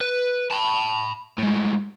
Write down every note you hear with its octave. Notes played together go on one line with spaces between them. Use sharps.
B4
A5 B5
A2 G#3